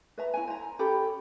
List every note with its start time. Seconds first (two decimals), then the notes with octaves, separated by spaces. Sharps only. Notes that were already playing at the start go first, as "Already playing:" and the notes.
0.18 B4 E5 A#5
0.34 E4 F#5 G#5
0.47 C5 A#5
0.79 C#4 G4 A4 B5